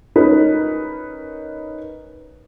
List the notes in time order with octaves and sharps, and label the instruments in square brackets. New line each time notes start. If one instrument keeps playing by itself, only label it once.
[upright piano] C#4 D#4 A#4 B4